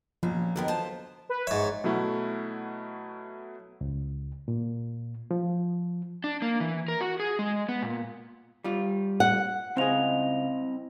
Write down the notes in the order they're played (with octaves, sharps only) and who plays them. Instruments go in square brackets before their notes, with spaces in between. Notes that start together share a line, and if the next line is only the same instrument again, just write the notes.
[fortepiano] A#1 B2 [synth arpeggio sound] F3 [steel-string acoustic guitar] C#4
[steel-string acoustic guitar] B2 D#3 A#4 [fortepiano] D3 F#3 B3
[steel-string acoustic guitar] F4 C5 A5
[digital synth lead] B4
[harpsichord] G#2 E5 [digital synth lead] C#5
[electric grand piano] B2 F#3 A3 E4 F#5
[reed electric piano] C#2
A#2
F3
[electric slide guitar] D4
A#3
E3
A#4
F#4
G#4
G#3
B3
A#2
[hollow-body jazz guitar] G3 F4
[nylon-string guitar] F#5
[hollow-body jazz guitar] C#2 G#4 [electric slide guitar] C4 E4 D#5 [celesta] C5 F5 F7